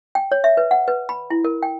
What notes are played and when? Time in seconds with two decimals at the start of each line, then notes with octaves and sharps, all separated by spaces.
0.15 G5
0.32 C#5
0.44 E5
0.57 B4
0.71 F#5
0.88 B4
1.09 B5
1.30 E4
1.44 A#4
1.63 G5